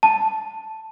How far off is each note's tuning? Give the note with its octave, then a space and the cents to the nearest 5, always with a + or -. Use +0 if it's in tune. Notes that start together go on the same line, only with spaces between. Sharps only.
A5 +5